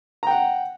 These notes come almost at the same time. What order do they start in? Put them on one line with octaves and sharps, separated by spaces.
A#5 G5 F#5